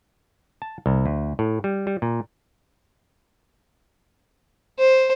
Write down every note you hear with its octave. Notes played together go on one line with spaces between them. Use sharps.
A5
C2
D2
A2
G3
G3
A#2
C5